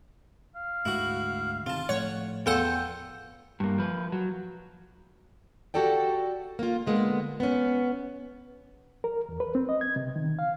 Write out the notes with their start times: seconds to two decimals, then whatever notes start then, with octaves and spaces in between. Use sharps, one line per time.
0.56 F5
0.85 D2 G#2 E4 F#4
1.66 C3 D#3 F4 A5
1.89 A2 F3 A3 C#5 F#5
2.46 E2 F4 A4 F#5 G5
3.60 G2 A#3
3.78 F3 B4
4.12 F#3
5.74 F#4 G4 A4 D5 G5
6.59 A#3 F4
6.86 D3 G#3 A#3 B3
7.40 B3 C#4
9.04 A#4
9.29 E2
9.40 B4
9.55 C4
9.69 D#5
9.81 G#6
9.96 C3
10.16 D#3
10.39 F5